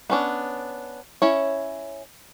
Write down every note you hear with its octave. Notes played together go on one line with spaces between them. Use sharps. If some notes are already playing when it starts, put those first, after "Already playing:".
B3 C#4 D4
C#4 E4 C#5